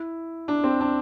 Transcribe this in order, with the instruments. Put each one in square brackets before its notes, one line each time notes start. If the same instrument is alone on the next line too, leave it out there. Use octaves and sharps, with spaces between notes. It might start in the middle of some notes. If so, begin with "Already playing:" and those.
Already playing: [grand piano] E4
D4
C4
D4